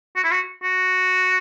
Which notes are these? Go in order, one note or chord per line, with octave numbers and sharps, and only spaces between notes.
F#4
E4
F#4
F#4